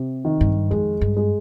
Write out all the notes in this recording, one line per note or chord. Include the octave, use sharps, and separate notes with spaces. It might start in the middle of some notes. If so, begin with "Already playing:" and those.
Already playing: C3
D#3
G2
F2 G#3
G2
G#3